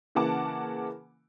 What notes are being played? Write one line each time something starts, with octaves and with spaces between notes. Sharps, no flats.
C#3 E3 A#3 F#5 A5 D6